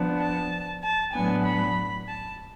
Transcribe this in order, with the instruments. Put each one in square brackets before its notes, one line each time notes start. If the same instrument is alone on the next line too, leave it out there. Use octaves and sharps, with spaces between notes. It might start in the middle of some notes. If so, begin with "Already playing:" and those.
Already playing: [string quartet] F3 B3 D4
A5
A5
A2 F#3 B3 D4 G#5
B5
A5